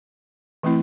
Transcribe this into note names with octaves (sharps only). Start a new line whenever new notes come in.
E3 A3 C4 E4